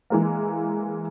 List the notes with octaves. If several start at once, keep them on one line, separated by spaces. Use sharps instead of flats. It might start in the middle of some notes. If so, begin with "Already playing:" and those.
E3 G#3 A#3